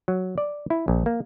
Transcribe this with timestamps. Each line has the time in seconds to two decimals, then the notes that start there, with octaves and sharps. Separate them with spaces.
0.08 F#3
0.38 D5
0.70 E4
0.88 A#1
1.06 A#3